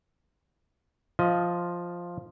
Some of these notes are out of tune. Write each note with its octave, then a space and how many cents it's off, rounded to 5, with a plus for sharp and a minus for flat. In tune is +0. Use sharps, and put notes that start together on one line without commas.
F3 +0 F4 +0 D#5 +15